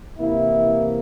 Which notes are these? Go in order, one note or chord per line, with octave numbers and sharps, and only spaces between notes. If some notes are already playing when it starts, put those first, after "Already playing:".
C3 E3 A#3 E4